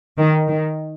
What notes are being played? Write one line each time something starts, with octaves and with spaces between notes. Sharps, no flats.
D#3
D#3